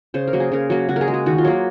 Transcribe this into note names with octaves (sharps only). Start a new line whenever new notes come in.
C#3 C5
A#4
F#3 A#3
G#4
C#3 A#4
F#3 A#3
C#3 F#4
G#4 A#4
G#3
G#4
D#3 F#4
F4
F#3 A#3